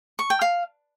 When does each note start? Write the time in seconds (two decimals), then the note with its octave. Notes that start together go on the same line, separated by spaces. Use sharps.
0.19 C#6
0.30 G5
0.42 F5